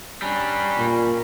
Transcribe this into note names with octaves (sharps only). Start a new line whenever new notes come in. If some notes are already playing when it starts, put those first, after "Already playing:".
G3 C#4 D4 A#5 B5
A#2